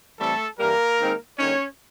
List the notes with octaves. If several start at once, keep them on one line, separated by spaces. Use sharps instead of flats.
A2 E3 G3 A3 C4 A4
G2 E3 G3 A#3 A#4
D#3 G#3 C4 D#4
D3 G3 A#3 C#4 D#4 C#5